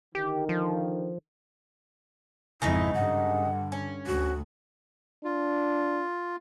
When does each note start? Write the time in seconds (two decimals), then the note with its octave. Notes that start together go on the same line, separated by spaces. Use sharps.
0.15 D3 D#3 G4
0.49 F3
2.62 G#1 F2 C#3 G#3 D#4 E4
2.94 G2 D3 F#5
3.72 C#4
4.07 D2 F#4
5.24 D4 F4